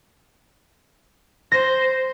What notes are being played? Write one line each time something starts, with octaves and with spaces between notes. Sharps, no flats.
C5 A#6